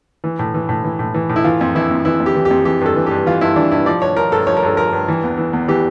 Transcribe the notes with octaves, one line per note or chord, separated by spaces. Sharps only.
E3
A2
E3
A2
E3
A2
E3
A2
E4
E3 F4
F2
E3 E4
F2
E3 E4
F2
G4
E3
G4
F2
E3 G4
G2 A4
E3
G2 G4
E3 F4
G2 E4
E3 D4
G2 E4
F3 D5
G2 C#5
F3 A#4
G2 A4
F3 C#5
A#4
G2 A4
F3 A#4
G2
E3
E2
E3
E2
E3 G4